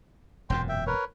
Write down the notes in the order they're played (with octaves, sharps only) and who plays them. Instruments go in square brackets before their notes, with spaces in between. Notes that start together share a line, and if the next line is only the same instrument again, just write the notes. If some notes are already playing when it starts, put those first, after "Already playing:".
[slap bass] E1 F#2 A#2 [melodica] G5 C6
[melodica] E5 G5
A#4 B4 C#5